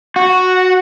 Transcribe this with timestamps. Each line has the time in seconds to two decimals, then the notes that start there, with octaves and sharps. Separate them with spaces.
0.16 F#4